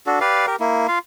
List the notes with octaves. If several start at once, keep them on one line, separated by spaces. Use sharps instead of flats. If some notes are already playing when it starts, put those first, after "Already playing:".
D4 F#4 A4
G4 B4 D5 F5
G4 A#4
A#3 E4
F4 F5